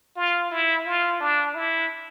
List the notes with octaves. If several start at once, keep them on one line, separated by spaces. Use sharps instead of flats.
F4
E4
F4
D4
E4